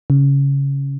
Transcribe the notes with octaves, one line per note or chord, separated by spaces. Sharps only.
C#3